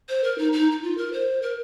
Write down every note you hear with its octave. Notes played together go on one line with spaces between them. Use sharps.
C5
A#4
D#4
D#4
D#4
F4
A#4
C5
A#4